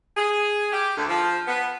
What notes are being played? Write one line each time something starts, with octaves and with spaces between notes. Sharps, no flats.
G#4
G4
D2
F3
B3